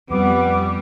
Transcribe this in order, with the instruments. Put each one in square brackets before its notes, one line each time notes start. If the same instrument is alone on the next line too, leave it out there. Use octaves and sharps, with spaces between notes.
[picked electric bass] F2 [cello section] G3 [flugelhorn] B3 [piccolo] D6